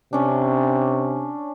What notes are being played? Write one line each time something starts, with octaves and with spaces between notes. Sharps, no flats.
C3 C#4 D4